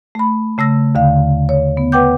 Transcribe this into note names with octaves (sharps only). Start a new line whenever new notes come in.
A3 B5
C#3 A3 E6 A#6
D#2 D3 F5
C#5
B3
B4 F#5 G5 D6 G6